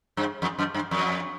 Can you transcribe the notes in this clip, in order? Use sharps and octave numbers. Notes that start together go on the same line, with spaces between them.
G2
F2
F#2
G2
F2